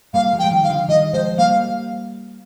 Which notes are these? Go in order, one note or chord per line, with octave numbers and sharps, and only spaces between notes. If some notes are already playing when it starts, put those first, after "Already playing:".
G3 A#3 F5
F3 G#3
G5
G#3
D#3 G3
F5
D3 F3
D#3 G3 D#5
F3 G#3 C5
G3 A#3 F5